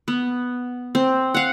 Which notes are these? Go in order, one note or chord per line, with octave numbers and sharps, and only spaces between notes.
B3
C4
F5 F#5